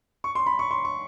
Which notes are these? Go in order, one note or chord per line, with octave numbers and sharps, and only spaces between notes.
C#6
C6
B5
C#6
C6
C#6